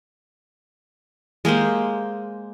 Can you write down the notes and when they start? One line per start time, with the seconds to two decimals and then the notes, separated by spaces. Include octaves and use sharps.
1.45 G#3 A#3 G4 C5